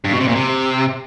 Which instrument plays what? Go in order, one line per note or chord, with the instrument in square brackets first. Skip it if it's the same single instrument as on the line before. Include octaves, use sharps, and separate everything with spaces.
[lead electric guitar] G2
B2
C3
A#2
C3